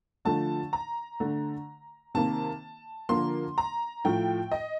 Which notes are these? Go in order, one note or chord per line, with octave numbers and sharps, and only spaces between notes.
D3 F3 A3 A5
A#5
D3 A3
C3 D#3 A#3 A5
D3 F3 A#3 C6
A#5
A2 F3 A3 G5
D#5